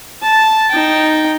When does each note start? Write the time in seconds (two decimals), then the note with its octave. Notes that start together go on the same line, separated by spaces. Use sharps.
0.22 A5
0.71 D#4 G5